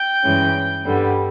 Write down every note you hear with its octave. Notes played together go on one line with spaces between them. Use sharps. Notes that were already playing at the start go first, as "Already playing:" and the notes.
Already playing: G5
G2 E3 G#3 C#4
G2 D3 G3 B3